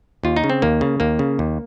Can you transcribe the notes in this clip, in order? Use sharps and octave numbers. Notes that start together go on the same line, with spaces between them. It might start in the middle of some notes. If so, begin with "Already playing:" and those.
D#2 F4
D#4
C#3
C4
D#2 A#3
C#3
D#2 A#3
C#3
D#2